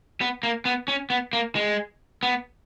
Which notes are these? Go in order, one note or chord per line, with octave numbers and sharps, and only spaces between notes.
B3
A#3
B3
C#4
B3
A#3
G#3
B3